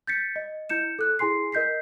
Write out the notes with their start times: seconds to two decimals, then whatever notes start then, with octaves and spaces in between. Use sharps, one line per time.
0.07 G6 A6 B6 C#7
0.36 D#5
0.69 E4 G6 C#7 E7
0.99 A4 F#6
1.19 E4 G#4 G#5 C6 C7
1.52 A#4 D#5 G6 B6 C7